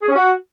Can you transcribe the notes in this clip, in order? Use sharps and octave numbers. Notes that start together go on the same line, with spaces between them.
G#4
C#4
F#4